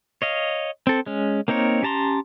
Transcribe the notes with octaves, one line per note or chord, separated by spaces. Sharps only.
C#5 D#5 F5
C4 A4
G#3 C#4
A#3 C4 D#4 A#4 C#5
C#4 G4 A5 A#5 C6